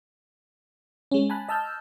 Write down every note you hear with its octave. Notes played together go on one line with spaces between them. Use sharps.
G#3 C#4
G#5 A5 B5 F#6
D#5 A5 E6 F6 G6